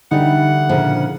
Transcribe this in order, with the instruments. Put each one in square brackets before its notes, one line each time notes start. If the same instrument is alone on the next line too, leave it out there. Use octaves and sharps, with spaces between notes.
[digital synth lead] D3 [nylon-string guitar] E3 G3 [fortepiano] D#4 [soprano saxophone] F#5
[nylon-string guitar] A#2 C#3 E4 [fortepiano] F3